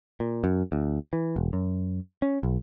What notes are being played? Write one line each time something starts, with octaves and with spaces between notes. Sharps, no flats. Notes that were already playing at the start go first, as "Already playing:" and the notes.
A#2
F#2
D2
E3
E1
F#2
C#4
B1